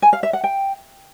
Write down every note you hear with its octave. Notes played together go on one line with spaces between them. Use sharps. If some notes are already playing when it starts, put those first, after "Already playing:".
G#5
F5
E5
F#5
G5